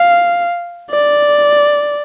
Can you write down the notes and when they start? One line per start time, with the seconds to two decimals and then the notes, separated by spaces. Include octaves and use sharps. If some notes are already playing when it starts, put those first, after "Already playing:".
Already playing: F5
0.91 D5